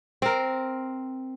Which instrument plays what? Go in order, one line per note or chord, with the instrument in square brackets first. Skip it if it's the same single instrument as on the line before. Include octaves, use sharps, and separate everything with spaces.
[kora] C4 A#4